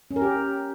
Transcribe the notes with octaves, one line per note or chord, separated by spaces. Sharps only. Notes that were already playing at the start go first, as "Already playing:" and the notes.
C#4
A#4
G4